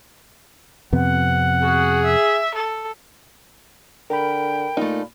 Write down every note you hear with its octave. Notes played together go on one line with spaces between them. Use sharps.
F2 C3 B3 F#5
F#4 G#4
E5
A4
D3 A#4 G5 B5
A#2 A3 D#4